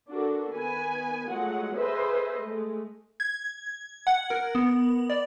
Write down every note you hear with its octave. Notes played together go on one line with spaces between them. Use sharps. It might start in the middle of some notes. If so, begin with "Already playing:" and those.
D4 F#4 A4 A#4
D#3 B3 B4 G#5
F#3 G#3 A3 F4 F#5
G#4 A4 B4 C5 D#5 E5
G#3 A3
G#6
F#5
A#4
B3
D5